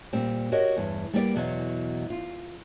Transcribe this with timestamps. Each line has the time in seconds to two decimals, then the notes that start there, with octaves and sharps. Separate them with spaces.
0.13 A#2 G3 C4
0.52 F#4 G4 A#4 C#5 D#5 F#5
0.77 E2 G2
1.13 G3 A#3 B3 G4 C#5 D5
1.36 E2 B2 F#3
2.10 F4